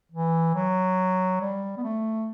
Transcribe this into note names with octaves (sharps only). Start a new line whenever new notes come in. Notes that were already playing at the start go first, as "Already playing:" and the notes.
E3
F#3
G3
B3
A3